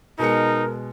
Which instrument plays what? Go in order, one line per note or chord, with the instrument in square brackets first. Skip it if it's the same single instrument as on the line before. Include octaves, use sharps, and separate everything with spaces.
[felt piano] B2 G#3 C#7 [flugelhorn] D#4 [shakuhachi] A#4